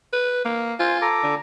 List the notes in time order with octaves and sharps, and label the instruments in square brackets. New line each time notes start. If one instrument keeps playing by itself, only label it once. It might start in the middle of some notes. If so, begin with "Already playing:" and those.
[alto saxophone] B4
A#3
[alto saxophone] F4 [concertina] C5 G#5
[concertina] A4 A#5 D6
[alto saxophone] D3